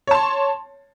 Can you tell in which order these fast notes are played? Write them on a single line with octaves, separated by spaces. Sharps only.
C#5 A5 C6